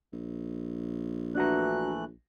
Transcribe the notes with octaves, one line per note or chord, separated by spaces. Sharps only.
A#1
E3 A3 D4 F#4 A#5 F#6